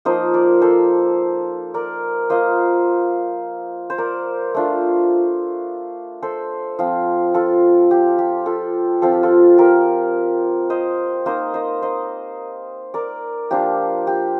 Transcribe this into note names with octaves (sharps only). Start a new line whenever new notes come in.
F3 A#3 D#4 C5 D#5
A#4 D5
A4 C5
A#4 D5
A#3 F4 C5 D#5
C5
A#4 D5
A3 D4 F4
A4 C5
F3 C4 F4
F4 A4
G4
G4
F4 A4
F3 C4 F4 A4
G4
F4 A4
G4 A#4
C5 D#5
A#3 D#4 C5 D#5
C5 D#5
C5 D#5
A#4 D5
F3 A#3 D4 F4 G4
G4